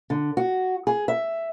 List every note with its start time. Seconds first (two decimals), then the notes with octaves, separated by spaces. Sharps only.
0.10 D3
0.37 F#4
0.87 G#4
1.08 E5